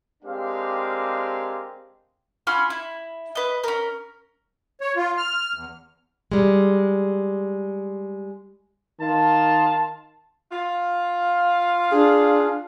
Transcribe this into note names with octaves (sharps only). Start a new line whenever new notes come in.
G#3 C4 D4 G4 A#4 F5
C#4 F4 B5 F6
E4
B4 D#5
C#4 A#4
C#5
F4
F6
E2
G3 G#3
D#3 F4 A5
F4
D4 G#4